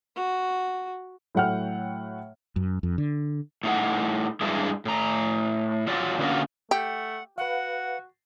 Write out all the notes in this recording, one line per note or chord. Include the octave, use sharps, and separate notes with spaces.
F#4
A2 F#3 A4 F#5 G5 F6
F#2
F2
D3
A2 D#4 F#5
G2 G#3 D4 E4
A2 A#5
F#3 F4 D5
D3 F#3 A#3 C#4 F4 F#4
A3 G4 F#5
F#4 B4 F5 F#5